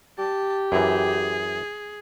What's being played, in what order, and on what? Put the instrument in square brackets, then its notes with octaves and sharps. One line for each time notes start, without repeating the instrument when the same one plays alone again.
[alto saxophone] G4 [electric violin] A5
[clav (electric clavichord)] F#2 E3 [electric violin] G#4